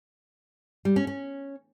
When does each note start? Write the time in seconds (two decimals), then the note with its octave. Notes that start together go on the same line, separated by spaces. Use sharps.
0.85 G3
0.96 C#4
1.07 C#4